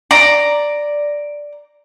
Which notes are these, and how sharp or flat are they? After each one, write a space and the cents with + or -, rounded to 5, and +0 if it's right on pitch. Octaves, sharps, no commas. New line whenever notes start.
D5 +0 A#5 +0